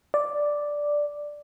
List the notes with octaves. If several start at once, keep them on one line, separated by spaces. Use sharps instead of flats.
D5